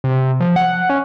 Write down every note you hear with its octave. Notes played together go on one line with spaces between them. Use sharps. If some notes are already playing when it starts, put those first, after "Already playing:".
C3
F3
F#5
C#4